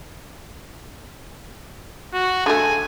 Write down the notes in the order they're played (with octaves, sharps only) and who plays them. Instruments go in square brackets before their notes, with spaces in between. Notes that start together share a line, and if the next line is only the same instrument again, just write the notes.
[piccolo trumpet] F#4
[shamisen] D3 A3 [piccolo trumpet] G#5